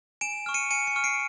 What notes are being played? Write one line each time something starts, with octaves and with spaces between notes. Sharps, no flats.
G#5 D7 E7
C#6 F6
C#7 D#7
G#5 C#7 D#7
C#7 D#7
C#6 F6
C7 D7